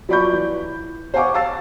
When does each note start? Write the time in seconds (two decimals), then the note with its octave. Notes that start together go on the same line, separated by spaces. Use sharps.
0.09 F3 F#3 D5 B5 C#6 G6
0.32 E3
1.14 C5 F5 F#5 G#5 C#6 D6
1.34 F5 A5 E6 A6 C7